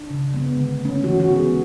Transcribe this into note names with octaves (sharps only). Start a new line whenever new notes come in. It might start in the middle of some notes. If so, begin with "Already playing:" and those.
Already playing: D4
C#3
G#3 B3
D3
A3 C#4
E3 F#4
F#4
G#3 B3
G#4